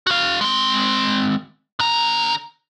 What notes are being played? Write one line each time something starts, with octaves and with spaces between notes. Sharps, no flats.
F#4 F5
G#3 C4
D3 A#5